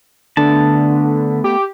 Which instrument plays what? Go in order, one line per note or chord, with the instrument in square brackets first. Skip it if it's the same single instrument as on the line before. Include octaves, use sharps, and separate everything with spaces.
[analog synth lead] D3 [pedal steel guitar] A3 B3 A5
[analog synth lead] G4